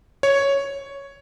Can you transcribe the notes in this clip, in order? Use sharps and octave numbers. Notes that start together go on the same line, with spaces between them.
C#5